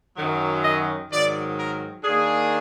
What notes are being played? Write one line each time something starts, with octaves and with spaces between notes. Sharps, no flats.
F#2 D#3 F#3
D#5
G#2 D#3 F#3 D5
A#4
D#3 A#3 D4 G#4